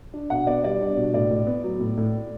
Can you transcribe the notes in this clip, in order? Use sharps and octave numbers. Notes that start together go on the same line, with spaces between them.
D4
B2 F#5
B3 D5
G3 D5
D4
B2
A2 D5
A2
B3
F#3
A2
A2